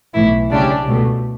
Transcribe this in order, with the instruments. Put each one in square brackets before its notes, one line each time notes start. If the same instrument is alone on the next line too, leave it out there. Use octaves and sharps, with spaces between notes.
[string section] B1 A2 E3 [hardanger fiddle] E4
[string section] D2 C#3 G3 C#4 G4 [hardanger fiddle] D4
[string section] C#2 B2 A3